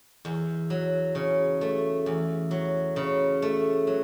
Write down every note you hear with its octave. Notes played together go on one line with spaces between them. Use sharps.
E2
F#3
C#3
A3
E2
F#3
C#3
A3
F#3